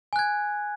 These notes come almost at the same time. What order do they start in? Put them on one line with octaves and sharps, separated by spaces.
G#5 F#6 G#6